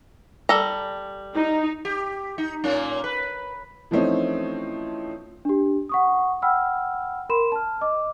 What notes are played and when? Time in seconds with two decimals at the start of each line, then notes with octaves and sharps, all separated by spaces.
0.49 G3 A4 A#5
1.35 D#4
1.85 G4
2.38 D#4
2.64 A#2 A#3 C#4
3.04 B4
3.91 E3 F3 A3 C4 C#4 D#4
5.45 D4 G4
5.89 F#5 C#6 D#6
6.42 F#5 G5 B5 E6 F6
7.29 A#4 B5 C6 E7
7.52 A5 F6
7.81 D#5 D6